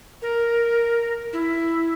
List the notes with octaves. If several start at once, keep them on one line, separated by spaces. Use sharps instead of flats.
A#4
E4